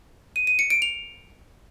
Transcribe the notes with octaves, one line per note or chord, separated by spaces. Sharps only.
D#7
D#7
C#7
D7
F7